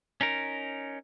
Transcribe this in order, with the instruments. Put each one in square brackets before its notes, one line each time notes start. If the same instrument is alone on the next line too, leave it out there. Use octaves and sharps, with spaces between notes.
[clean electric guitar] C#4 D#4 A#4